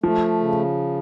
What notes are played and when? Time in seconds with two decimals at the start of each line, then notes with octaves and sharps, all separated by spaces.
0.03 F3 A3
0.40 C#3